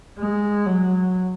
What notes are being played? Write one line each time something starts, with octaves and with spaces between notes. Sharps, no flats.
G#3
F#3